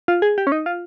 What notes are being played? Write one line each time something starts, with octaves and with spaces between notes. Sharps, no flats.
F4
G#4
G4
C#4
D#4
F4